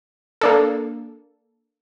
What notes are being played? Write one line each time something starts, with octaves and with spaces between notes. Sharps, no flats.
A#3 D4 A4